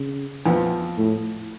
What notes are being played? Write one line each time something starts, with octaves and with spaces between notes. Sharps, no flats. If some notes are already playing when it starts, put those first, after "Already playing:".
Already playing: C#3
F2 F3 B3
A2